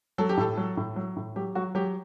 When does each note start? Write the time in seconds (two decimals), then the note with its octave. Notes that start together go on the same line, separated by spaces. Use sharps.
0.18 F#3 A4
0.29 G4
0.37 A2 A4
0.57 F#3
0.77 A2
0.96 F#3
1.16 A2
1.36 F#3 G4
1.55 F#3 F#4
1.75 F#3 G4